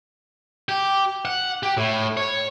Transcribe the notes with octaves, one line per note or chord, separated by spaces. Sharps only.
G4
F#5
G4
A2
C#5